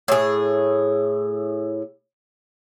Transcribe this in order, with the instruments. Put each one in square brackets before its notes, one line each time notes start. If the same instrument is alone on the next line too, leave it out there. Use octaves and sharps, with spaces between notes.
[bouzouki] A2 G#4